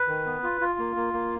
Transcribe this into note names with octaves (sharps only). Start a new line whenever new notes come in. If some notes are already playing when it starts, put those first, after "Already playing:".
Already playing: B4
D#3
B3
F4
F4
A#3
A#3
A#3